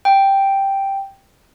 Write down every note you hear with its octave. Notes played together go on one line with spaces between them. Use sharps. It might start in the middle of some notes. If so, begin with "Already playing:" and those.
G5